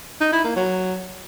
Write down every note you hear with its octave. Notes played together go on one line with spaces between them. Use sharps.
D#4
E4
A#3
F#3